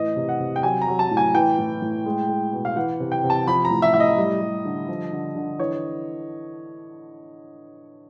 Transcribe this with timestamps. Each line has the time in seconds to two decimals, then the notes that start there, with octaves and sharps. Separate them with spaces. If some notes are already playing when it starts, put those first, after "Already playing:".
Already playing: A2 E3 D#5
0.16 C3
0.29 F#5
0.40 C3
0.56 G5
0.63 F#3 G#5
0.81 A#5
0.88 F#3
0.99 A5
1.11 A2
1.17 G#5
1.35 E3 G5
1.58 A2
1.82 A2
2.06 G#3
2.29 G#3
2.53 B2
2.65 F5
2.76 E3 F#5
3.00 C3
3.12 G5
3.24 C3
3.30 A5
3.47 F3 B5
3.65 A#5
3.71 A2
3.82 E5
3.94 A2 E5
4.00 D#5
4.18 G3
4.41 G3
4.65 D3
4.88 F3
5.12 D3
5.36 D3
5.60 E3 C#5